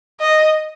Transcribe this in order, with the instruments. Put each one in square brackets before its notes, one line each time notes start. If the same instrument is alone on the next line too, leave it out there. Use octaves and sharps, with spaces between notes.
[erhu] D#5